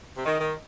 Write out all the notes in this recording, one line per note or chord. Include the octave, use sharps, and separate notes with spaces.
C3
D#3 D#5
D#3